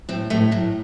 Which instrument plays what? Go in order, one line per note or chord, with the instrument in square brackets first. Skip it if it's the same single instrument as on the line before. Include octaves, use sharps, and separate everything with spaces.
[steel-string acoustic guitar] A2 C4
A2 A3
A2 F#3